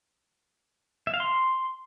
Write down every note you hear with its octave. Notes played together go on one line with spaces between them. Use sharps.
E5
F5
C6